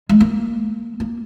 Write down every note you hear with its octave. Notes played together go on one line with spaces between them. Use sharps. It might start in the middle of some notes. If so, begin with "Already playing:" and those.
G#3
A#3
A#3